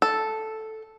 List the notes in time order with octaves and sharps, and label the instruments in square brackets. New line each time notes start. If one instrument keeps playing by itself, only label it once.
[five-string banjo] A4